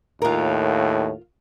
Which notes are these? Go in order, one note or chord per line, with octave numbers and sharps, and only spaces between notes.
D#2 A2 F4 A#4